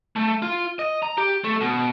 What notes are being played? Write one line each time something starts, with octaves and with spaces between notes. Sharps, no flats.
A3
F4
D#5
A#5
G4
A3
B2